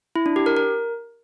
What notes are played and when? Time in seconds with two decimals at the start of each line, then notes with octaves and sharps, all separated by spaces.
0.16 E4
0.26 D4
0.36 G4
0.46 A#4
0.57 A#4